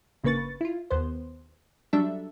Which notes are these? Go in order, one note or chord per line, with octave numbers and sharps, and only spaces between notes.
G1 C#3 A#3 B4 C#6 A6
E4 F4
D#2 B3 C5
F#3 G3 D4 A4 E5